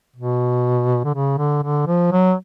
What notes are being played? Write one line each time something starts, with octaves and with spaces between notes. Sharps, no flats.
B2
D3
C#3
D3
D3
F3
F#3